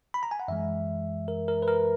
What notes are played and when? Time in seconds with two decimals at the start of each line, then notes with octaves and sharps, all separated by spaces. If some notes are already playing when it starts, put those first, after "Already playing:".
0.14 B5
0.23 A#5
0.31 G#5
0.40 F#5
0.48 F#2 E3 G#3 E5
1.28 A#4
1.48 A#4
1.62 B4
1.68 A#4